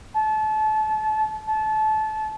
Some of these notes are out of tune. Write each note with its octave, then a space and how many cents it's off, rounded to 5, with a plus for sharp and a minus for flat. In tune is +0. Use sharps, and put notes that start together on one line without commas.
A5 -30
A5 -25